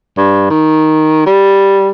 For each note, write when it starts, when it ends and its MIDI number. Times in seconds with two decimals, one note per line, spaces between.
0.17 0.45 43
0.50 1.24 51
1.26 1.90 55